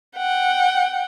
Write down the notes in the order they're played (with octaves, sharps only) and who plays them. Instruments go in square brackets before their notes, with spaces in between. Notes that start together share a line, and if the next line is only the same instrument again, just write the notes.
[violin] F#5 G5